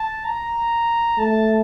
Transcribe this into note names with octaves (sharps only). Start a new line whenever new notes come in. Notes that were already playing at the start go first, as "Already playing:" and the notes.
Already playing: A5
A#5
A3 A5